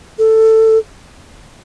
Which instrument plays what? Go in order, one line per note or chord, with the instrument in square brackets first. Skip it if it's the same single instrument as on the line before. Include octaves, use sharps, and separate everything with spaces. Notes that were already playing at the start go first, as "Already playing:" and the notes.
[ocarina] A4